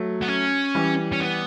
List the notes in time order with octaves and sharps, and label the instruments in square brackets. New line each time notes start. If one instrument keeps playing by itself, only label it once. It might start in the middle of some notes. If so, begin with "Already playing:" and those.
Already playing: [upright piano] F#3 A3
[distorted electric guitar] B3
C#4
[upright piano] E3 G3
[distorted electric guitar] C#4
B3